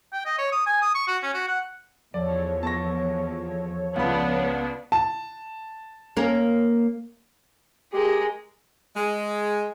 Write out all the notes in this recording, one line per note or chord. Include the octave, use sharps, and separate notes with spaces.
G5
D#5
C#5
D#6
G#5
D#6
C#6
F#4
C#4
F#4
F#5
E2 F3 A4 C#5 D5
B3 A5 C#6 A#6
C#2 B3 D4 F5 B5
A5
A#3 C#4 A#4
G#3 G4 A#4
G#3